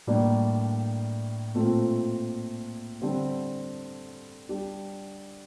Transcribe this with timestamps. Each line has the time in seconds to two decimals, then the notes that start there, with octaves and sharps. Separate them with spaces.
0.07 A2 G3 A#3 D4 G4
1.55 A#2 A3 C4 F4
3.02 D3 G3 C4
4.49 G3 D4 G4